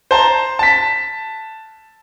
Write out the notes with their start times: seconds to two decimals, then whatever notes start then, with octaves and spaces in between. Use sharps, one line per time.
0.11 C5 A5 A#5
0.59 A5 B6